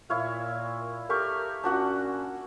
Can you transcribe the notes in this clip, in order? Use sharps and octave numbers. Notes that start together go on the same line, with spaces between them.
A#2 E4 C#5 F5
G4 A4 A#4 C#6 F6
A#2 C#4 D4 F#4 F#5